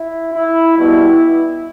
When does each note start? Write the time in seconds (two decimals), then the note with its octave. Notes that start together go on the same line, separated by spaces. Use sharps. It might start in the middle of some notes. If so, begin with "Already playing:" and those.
Already playing: E4
0.33 E4
0.76 B2 G3 B3 E4